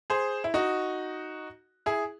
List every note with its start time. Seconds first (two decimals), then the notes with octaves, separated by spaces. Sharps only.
0.10 G#4 C5
0.44 E4
0.54 D#4 F#4
1.86 E4 G#4